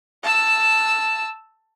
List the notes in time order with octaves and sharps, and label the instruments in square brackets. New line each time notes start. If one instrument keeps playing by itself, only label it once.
[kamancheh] A5 E6